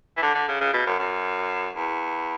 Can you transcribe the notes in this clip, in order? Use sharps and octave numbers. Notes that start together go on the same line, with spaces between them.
E3
D3
D3
C#3
C#3
B2
F#2
F#2
E2